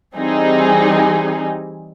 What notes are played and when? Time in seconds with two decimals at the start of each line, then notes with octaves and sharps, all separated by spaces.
0.16 E3 G3 C4 D#4 G#4